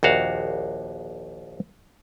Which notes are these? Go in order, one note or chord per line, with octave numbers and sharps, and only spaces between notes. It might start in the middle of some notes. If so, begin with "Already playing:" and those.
A#1 D#2 F#4 F5